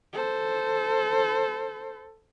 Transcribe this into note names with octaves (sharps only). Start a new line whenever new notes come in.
A4 C5